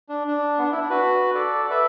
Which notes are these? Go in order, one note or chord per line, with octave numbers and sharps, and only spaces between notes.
D4
D4
B3
D4
E4
D4
F#4 B4
A4 D5
D5
B4 E5